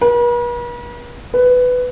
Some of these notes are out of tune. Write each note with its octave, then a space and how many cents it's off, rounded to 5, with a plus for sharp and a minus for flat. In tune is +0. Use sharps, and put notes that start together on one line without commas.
B4 -45
B4 +10